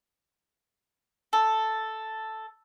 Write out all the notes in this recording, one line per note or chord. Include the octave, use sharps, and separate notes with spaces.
A4